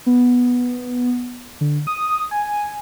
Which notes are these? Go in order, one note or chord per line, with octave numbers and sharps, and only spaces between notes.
B3
D3
D#6
G#5